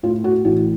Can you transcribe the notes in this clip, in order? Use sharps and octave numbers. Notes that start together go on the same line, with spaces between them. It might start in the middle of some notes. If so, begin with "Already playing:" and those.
A2 F4
F#4
A1 F#4